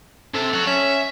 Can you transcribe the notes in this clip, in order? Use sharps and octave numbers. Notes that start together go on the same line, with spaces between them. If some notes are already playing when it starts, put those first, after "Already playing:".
C3 A4
C#5 F#5
C#4 E5